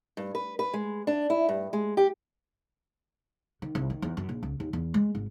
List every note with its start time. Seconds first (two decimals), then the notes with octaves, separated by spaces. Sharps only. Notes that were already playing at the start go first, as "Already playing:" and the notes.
0.17 G2
0.35 B4
0.59 B4
0.73 G#3
1.07 D4
1.30 E4
1.49 G2
1.73 G#3
1.97 G4
3.62 D#3
3.75 C2
3.90 D#3
4.02 E2
4.17 F#2
4.29 A#1
4.43 C#2
4.60 D#2
4.73 E2
4.94 G#3
5.15 G#1